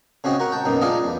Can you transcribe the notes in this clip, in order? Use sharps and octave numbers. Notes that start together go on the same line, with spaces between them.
C#3 C4 F#4 G#4 D#5
F#4 A#4 F#5
G5 A5
F#2 B2 A#3 D#4
D4 F4 G#4 D5 D#5 F5
E2